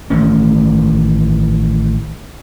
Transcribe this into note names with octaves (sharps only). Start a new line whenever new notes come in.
A1 D#3 A3 C#4